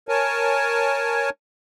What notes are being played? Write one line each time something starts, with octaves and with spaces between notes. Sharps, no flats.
A#4 C#5 G#5 A5